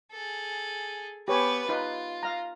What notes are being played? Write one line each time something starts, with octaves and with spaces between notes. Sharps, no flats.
G#4 A4
B3 G4 B4 C#5 G#5
D#4 F4 B4
F5 A#5